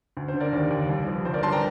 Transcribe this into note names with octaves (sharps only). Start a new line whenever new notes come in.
D2
C5
D3
A#4 D5
D#2
D#2
C2
F3
G1 C5
A#4 D5
G1 A5 C6
G5 A#5